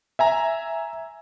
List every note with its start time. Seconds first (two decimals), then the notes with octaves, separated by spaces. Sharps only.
0.19 E5 G#5 A#5